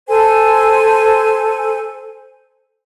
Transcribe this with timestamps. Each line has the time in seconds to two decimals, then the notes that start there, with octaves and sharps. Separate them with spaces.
0.08 A4 C5 G#5